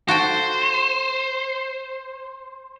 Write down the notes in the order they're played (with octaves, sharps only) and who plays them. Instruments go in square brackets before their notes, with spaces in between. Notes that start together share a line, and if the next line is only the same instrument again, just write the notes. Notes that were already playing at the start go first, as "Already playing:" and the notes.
[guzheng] F#4 A4 G5 [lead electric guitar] C5